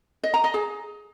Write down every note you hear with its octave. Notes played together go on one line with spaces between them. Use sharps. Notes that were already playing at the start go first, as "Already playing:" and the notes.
D#5
A#5
D#5
G#4